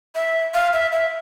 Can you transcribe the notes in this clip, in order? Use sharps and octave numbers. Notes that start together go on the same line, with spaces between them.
E5
F5
E5
E5